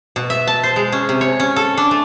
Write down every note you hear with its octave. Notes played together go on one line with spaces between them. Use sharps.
B2
E5
A5
C5
G#3
C#4
C3
C#5
C#4
A4
D4
A3